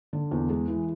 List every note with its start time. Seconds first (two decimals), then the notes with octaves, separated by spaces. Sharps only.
0.13 D3
0.31 E2
0.49 G#3
0.68 E3